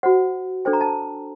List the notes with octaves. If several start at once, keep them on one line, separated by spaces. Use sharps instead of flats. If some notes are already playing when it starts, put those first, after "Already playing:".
F#4 C5 F#5
D4 A4 C5 G5
A#5
A5